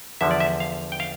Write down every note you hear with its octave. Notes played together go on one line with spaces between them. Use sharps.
E2 D3 F3 E5
D5
E5
F5
G5
F5